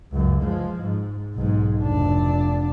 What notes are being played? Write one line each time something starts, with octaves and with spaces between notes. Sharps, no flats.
C#2 F#2
F3 G#3
G#2
B1 G#2
F1 D4